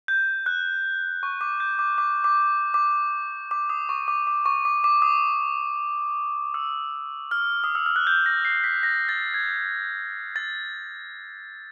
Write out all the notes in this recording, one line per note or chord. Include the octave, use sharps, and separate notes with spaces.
G6
F#6
C#6
D6
G6
D6
D6
D6
D6
D6
D#6
C#6
D6
D6
C#6
D6
D6
D#6
E6
F6
D#6
E6
F6
F#6
G6
A#6
C7
B6
A#6
A6
G#6
A6